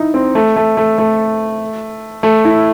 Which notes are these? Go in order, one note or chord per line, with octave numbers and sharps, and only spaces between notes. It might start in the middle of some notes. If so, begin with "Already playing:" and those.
Already playing: D#4 E4
C4
A3
A3
A3
A3
A3
E4